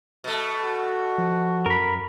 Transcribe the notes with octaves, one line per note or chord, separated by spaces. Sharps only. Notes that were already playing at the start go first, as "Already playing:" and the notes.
B2 A3
F#4
F3
F#2 A#4 B5